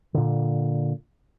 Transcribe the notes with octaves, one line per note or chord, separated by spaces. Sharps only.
A#2 D3